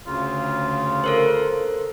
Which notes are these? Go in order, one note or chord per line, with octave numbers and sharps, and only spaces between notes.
D2 C#3 F4
A4 A#4 C5